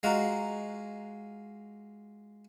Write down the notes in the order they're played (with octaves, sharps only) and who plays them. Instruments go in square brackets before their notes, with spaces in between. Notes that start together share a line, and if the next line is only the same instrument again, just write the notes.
[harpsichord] G#3 F4 F#4 [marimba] D#5 A#5